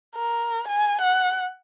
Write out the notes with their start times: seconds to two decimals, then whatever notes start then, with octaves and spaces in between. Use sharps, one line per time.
0.16 A#4
0.68 G#5
1.01 F#5